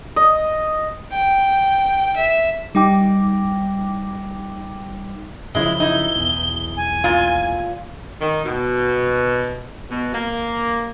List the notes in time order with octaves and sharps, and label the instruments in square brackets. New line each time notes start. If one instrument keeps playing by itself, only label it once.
[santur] D#5
[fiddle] G5
E5
[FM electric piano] G3 D#4 G5 D6
[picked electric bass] F#2 C#3 F3 [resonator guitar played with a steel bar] G#3 E4 [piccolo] G7
[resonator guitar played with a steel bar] D#4 E4
[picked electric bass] B1 E2
[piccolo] G#5
[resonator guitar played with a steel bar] A#2 F4
[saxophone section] D#3
B2
B2
A#3